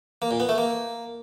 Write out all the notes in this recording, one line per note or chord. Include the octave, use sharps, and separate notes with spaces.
A#3
A#2
B3
A3
A#3